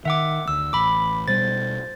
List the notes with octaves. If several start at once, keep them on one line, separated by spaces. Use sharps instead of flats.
D#3 E5 F#5 D6
D2 E6
A1 B5 D6
B2 G3 C5 A6